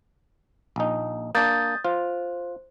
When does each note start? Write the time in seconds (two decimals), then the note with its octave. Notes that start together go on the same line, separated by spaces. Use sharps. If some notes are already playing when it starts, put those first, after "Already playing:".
0.76 A#1 D#4
1.35 A#3 D4 D#6 G6 A6
1.85 F4 C5